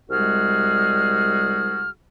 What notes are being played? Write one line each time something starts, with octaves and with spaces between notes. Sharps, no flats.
C2 G3 G#3 F#4 G#4 F6